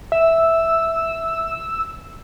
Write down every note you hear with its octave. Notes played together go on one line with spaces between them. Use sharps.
E5 E6